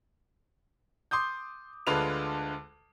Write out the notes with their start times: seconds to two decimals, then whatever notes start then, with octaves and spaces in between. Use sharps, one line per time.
1.11 C6 D6 D#6 G6
1.87 D2 D3 G#3 F4 B4 F7